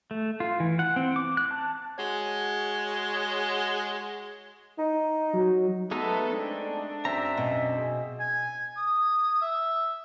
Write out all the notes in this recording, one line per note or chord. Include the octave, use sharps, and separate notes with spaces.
A3
F4
E3
F#5
C4
D6
F#6
A5
G#3 F#4 C#5
D#4
F#3
G#3 A3 B3 D#4 A4 E5
C4 D4
F#2 C4 E5 A#5
B2
G#4
G#5
D#6
E5